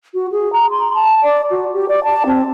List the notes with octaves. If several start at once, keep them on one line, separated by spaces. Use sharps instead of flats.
F#4
G#4
A#5
C6
A5
D5
F#4
G4
D5
A5
C4